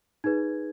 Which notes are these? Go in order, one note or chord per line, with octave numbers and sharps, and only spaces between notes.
D#4 G#4 B4 G#6